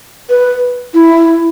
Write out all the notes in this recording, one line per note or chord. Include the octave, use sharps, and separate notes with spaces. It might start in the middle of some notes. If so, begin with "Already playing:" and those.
B4
E4